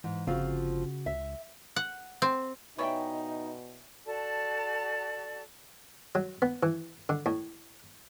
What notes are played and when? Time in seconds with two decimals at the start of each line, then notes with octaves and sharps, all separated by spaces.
0.04 G#2 E3
0.27 G1 C#3 F3 C4 F4 F#4
1.06 C#2 E5
1.76 F#5
2.22 C4
2.78 B2 E3 D#4 C#5 D5 E5 G5
4.06 F#4 A4 D5 A5
6.15 F#3
6.42 B3
6.63 E3
7.09 D3
7.26 A2